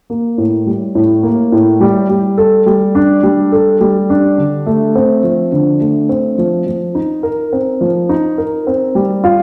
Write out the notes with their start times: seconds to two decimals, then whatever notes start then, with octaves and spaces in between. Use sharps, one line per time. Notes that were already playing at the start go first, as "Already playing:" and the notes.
0.10 A#3
0.38 A2
0.67 G3
0.95 A2
1.23 A#3
1.52 A2
1.80 G3
2.09 G3
2.38 A4
2.66 G3
2.95 D4
3.23 G3
3.52 A4
3.80 G3
4.10 D4
4.38 D3
4.66 A3
4.95 C4
5.24 F3
5.52 D3
5.81 A3
6.09 C4
6.38 F3
6.66 F3
6.95 D#4
7.23 A#4
7.53 C4
7.81 F3
8.09 D#4
8.38 A#4
8.67 C4
8.95 G3
9.24 F4